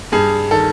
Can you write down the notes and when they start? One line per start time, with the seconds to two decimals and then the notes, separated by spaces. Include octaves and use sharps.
0.12 G2 G#4
0.51 D#3 A4